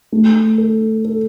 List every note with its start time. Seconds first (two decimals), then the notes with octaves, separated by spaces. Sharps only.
0.12 A3
0.58 A4
1.05 A4